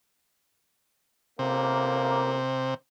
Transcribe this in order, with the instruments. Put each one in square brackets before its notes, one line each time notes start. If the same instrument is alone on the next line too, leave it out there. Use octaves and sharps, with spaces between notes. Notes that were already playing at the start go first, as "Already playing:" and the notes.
[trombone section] A1 A#3 [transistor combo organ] C3